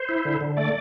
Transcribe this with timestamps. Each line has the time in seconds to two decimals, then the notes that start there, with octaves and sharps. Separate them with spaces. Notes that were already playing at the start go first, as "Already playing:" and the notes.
Already playing: C5
0.09 E4
0.25 D3
0.41 D3
0.57 A3 D5